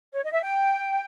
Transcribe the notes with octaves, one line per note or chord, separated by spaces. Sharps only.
C#5
D#5
E5
G5